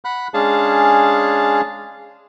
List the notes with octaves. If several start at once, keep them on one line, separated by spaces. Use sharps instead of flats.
F#5 B5 F#6
G#3 C#4 D4 G#4 F5 A5